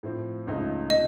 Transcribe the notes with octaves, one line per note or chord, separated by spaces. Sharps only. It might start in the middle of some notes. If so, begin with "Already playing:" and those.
A2 F3 C4
C#2 C#3 F3 A3 D#4
C3 F3 A3 D#5